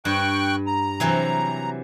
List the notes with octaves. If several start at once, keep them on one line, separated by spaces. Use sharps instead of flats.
G2 G5 C#6 F#6
A#5
C3 E3 F#3